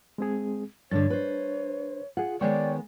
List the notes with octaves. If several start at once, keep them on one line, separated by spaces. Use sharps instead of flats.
G#3 C4 G#4
G2 D3 D4 C#5 A6
B4 C5
F4 G#4 F#5
D#3 G#3 B3 C#5 D5 G5 C#6